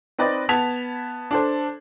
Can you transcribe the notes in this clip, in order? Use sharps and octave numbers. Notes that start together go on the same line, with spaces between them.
C4 D#4 B4 D5 D#5
B3 A5 G#6 B6 F7
D4 A4 C5